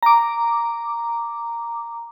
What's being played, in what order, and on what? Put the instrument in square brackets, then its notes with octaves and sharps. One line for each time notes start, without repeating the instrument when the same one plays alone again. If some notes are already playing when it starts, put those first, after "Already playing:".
[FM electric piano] A#5 D6